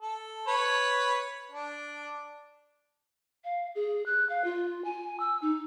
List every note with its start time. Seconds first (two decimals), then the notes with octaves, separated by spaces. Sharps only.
0.02 A4
0.47 B4 C#5
1.52 D4
3.44 F5
3.75 G#4
4.06 F#6
4.30 F5
4.44 F4
4.84 G#5
5.20 E6
5.42 D#4